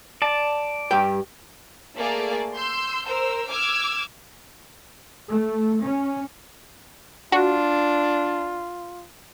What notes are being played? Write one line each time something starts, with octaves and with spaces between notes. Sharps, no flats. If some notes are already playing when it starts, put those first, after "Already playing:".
D5 A5
G2 G4 G5
A3 A#3 G#4 D5
C6 E6 G6
A#4 C5 E6
D6 E6 F6 G#6
A3
C#4
D4 F4 F#4